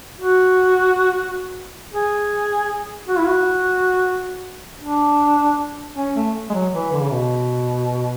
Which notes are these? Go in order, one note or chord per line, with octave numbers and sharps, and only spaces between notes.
F#4
G#4
F#4
E4
F#4
D4
C#4
A3
G#3
F#3
E3
D3
C#3
B2